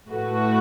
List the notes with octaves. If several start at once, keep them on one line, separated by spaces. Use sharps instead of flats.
A2 A3 F#4 B4